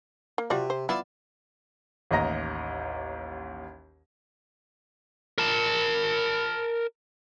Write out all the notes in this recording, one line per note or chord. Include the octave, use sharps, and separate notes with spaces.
A#3
C3 F4 F#4 D5
C5
B3 E4 F4 D5 A5
A1 D#2 D#5 A#5 A#6
A#4 A5